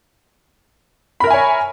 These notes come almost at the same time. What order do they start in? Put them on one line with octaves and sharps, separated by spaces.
B5 A#4 E5 G#5 C#5